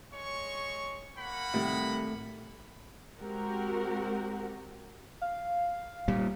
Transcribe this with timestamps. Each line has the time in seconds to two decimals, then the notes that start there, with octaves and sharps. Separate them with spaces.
0.12 G#3 C#5 C#6
1.18 A#3 F#5 B5
1.54 A2 C3 D#3 G3
3.19 G#3 C4 F#4 G4 A#4 F#5
5.22 F5
6.08 A#2 G3